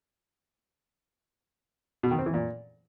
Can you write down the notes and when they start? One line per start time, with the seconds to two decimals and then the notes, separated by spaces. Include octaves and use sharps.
2.03 B2
2.11 D#3
2.19 C4
2.26 E3
2.34 A#2